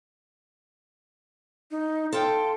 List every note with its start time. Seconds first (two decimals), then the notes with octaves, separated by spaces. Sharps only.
1.71 D#4
2.13 A4 F5 G5 C6